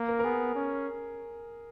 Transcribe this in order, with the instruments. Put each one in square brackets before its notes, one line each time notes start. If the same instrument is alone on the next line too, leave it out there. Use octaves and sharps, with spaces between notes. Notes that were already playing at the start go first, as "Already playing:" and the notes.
Already playing: [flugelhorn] A#3
[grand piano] A#4
A#4
[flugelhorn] B3 [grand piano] G#4
[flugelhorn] C#4